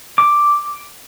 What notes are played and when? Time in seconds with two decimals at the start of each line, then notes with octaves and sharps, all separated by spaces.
0.18 D6